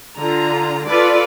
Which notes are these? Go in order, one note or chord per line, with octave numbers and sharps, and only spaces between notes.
D3 F4 A#5
F4 A4 B4 D5